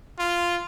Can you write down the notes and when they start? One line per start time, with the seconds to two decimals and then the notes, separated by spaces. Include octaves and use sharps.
0.19 F4